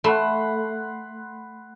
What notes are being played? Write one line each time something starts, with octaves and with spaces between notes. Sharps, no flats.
A3 F#5 B5 C6